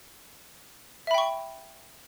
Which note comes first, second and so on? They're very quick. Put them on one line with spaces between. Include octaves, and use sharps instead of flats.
E5 B5 G5 C#6